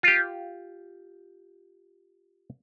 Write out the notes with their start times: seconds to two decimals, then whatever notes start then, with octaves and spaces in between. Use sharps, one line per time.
0.03 F4 G4